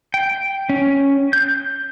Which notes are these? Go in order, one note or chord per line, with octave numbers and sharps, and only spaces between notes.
G5
C#4
G6